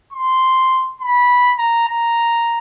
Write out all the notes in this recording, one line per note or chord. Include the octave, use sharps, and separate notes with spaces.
C6
B5
A#5
A#5